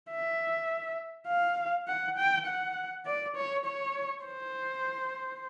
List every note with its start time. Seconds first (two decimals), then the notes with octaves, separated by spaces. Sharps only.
0.10 E5
1.28 F5
1.88 F#5
2.18 G5
2.46 F#5
3.06 D5
3.36 C#5
3.65 C#5
4.25 C5